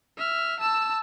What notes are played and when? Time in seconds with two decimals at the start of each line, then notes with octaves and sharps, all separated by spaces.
0.17 E5 F6
0.60 A5 E6